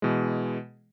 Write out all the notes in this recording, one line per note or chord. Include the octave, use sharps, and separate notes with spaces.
B2 E3 G#3